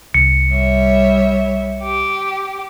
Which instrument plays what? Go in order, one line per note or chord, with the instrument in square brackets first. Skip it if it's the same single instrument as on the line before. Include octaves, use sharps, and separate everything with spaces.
[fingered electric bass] C2 [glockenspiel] C#7
[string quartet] G3 C#5 E5
G4